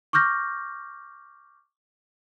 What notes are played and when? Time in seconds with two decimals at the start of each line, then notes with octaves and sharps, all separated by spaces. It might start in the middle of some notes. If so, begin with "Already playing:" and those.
0.13 C#6 D6 F6 G6 A#6